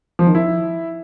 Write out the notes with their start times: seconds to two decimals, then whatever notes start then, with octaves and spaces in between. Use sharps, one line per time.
0.19 F3
0.27 D#3
0.35 E4